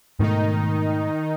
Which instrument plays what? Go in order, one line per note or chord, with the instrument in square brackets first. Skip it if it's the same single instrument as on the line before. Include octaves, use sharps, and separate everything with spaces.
[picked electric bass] G#2 B2 A3 [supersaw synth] D#3 D#4